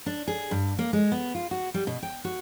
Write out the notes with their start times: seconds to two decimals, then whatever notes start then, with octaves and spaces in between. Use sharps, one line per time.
0.06 D4
0.28 G#4
0.51 G2
0.79 A#3
0.93 G#3
1.12 B3
1.35 F4
1.51 F#4
1.74 G3
1.87 B2
2.03 G5
2.25 F#4